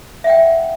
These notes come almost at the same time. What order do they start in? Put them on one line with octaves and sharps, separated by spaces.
E5 F#5 G5